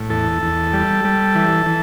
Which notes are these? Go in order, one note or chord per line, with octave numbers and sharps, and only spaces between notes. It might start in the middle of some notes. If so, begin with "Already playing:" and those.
Already playing: A2
E2 A4
E2
G3
G3
E3
E3